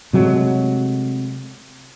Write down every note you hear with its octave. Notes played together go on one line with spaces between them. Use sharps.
C3 F#3 G#3 A3